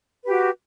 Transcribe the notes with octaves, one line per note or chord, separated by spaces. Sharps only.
F#4 G4 B4